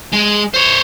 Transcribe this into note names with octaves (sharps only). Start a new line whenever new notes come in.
G#3
C5 C#5